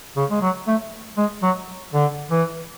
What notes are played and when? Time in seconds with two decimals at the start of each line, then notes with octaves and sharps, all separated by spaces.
0.16 C#3
0.30 G#3
0.41 F#3
0.67 A3
1.17 G#3
1.42 F#3
1.93 D3
2.31 E3